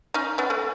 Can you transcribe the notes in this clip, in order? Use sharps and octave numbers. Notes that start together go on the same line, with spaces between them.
C#4 D#4
B3 C#4
A3